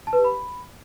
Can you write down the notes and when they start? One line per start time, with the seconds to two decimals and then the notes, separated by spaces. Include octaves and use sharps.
0.07 A5
0.13 B4
0.19 G4
0.24 B5